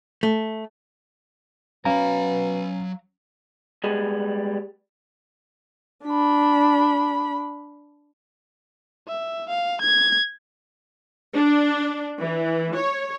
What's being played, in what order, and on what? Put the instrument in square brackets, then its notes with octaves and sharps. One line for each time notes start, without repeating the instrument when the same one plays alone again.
[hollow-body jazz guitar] A3
[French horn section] B2 F#4 B4 [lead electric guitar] F#3 B5 [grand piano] C#4 [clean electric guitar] F5 A#5
[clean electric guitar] G3 G#3 B3 G4 G#4
[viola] D4 B5
[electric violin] E5
F5
G#6
[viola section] D4
E3
C#5